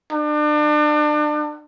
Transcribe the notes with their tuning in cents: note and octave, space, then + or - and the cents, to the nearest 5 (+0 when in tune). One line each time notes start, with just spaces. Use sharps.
D4 +35